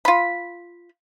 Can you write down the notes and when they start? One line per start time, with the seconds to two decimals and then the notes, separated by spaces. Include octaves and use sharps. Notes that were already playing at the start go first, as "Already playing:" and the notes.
0.05 F4 B5